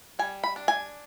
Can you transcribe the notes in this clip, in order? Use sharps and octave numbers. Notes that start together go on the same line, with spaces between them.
G3 G#5
B5
D4
G#5